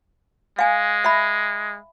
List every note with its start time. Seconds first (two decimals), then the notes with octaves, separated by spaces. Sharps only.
0.59 G#3 F5 G#5
1.04 E5 B5